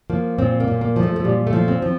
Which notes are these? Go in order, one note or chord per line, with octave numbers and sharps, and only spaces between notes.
F3 A#3
A#2 C4
A#3
A#2
A#3
F3
A3
A3
A#2 G3
A3
F3
C4
F3